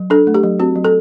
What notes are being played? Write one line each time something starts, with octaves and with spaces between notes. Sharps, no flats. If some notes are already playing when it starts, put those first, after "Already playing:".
Already playing: F#3
D4 A4
A3
G4
F#3
C4 F#4
F#3
A4